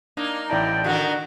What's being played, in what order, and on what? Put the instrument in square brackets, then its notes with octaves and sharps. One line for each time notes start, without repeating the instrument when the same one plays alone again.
[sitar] A#3 D#4 [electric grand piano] D4
[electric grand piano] A1 E4 A5 [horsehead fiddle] D5 G5
[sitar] D3 D#3 A#4 [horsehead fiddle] F#4